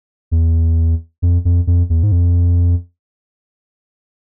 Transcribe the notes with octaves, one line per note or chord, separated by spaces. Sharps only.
E2
F2
F2
F2
E2
G#2
F2